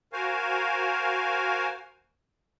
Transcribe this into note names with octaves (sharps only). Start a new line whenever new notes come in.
F#4 A#4 C5 F5 G#5